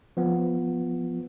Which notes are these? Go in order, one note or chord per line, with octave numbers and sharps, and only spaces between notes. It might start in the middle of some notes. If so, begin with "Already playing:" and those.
F3 B3